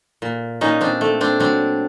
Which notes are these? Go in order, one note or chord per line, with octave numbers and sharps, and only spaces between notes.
A#2
A#2 C#4 D#4
C4 D4
A3
C4 D4
F#3 C4 D4